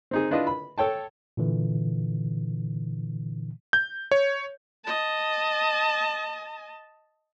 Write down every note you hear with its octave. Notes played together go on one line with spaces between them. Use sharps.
C4 D#4 G#4
D4 E4 F4 B4 D#5
B5
A4 C#5 G5 A5
A#2 D3 E3
G6
C#5
D#5 A5